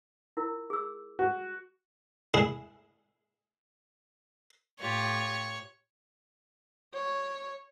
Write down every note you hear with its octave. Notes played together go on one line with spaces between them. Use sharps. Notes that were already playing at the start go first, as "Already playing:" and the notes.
E4 F4 A#4
G#4 E6
F#4
E4 G#4
A2 F4 G4 C#5
C#5